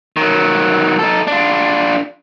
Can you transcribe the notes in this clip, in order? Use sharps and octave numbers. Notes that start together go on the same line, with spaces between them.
D#3 F#3
D#4 A4
D4 F4